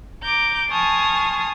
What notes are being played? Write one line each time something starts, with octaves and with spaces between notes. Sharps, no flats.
A#5 D6 G6
G#5 A5 C6 C#6 D#6 F6